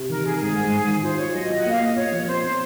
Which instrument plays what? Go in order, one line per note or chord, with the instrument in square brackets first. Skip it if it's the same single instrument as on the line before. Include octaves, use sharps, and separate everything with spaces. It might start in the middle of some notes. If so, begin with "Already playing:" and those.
Already playing: [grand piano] C3
[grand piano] D#3 [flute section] A#4
[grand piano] D#3 [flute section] G#4
[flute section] A#4
[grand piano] G#2 [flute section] G#4
[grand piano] G#2
G#2
D#3
[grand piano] F4 [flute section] C5
[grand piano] F4 [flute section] C#5
[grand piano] F#3 [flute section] D#5
[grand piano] F4
[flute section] F#5
[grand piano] A#3 [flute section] F5
[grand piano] A#3 [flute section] D#5
[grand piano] A#2 [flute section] C#5
[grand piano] F3
[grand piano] C4 [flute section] C5
[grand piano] C4